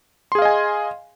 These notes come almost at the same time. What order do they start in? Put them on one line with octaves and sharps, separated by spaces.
C6 G#4 F5 D#5 G#5